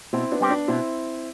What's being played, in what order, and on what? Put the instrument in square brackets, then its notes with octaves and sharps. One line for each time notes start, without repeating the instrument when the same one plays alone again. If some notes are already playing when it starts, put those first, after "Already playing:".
[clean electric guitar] B2 [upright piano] C4 E4
[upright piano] B3 D4
[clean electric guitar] G3 C4 G4
[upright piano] B3 D4
[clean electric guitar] B2 [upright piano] C4 E4